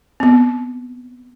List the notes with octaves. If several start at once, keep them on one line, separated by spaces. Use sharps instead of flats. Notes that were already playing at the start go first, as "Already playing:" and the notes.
B3 C4